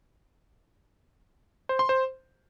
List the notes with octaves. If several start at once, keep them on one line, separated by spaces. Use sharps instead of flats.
C5
C6
C5